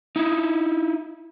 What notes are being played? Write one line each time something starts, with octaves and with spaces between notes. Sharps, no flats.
D#4 E4